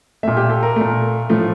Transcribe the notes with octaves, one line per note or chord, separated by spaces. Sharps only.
A#2 A3 E5
G4
A4
A#4
A#2 A3
A2 F3 A3